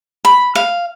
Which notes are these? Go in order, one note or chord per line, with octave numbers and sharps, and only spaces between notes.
B5
F5